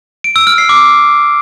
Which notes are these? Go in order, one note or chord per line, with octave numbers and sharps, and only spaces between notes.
D7
E6
F6
C7
D6